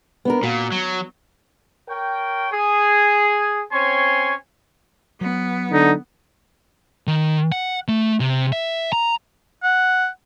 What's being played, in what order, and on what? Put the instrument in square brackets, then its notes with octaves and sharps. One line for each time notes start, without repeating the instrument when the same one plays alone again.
[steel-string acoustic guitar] B3 D4 A#4
[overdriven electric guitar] A#2 [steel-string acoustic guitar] F#4
[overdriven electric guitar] F#3
[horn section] A#4 C#5 G5
G#4
C4 C#4 C#5 G#5 C6
[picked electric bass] F#3 [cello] B3
[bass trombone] D3 [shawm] D#4
[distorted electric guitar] D#3
F#5
A3
C3
E5
A#5
[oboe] F#5